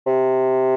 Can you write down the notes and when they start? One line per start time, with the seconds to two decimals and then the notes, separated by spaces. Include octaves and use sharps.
0.06 C3